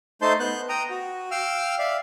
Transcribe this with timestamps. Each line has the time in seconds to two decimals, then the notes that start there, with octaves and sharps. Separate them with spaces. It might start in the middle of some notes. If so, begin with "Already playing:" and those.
0.22 A3 D#4 C5 A5 C6 G6
0.40 B3 F#6 G6
0.69 G5 A#5 D#6
0.90 F#4
1.31 F5 G5 E6 F6
1.79 D5 E5 F5